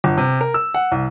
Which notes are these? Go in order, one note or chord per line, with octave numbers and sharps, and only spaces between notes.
G1
C3
A#4
E6
F#5
C2